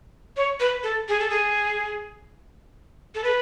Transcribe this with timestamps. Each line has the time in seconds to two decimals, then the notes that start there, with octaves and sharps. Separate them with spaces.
0.37 C#5
0.60 B4
0.83 A4
1.09 G#4
1.20 A4
1.30 G#4
3.15 A4
3.24 B4